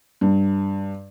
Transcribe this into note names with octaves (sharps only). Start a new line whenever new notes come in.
G2